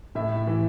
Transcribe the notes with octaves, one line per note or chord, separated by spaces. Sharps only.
A2 E5
E3